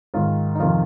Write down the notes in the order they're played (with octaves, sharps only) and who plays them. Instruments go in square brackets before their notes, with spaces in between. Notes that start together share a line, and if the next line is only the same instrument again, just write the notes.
[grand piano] G#2 D#3 F4
D#4
F2 C3 D#3 F4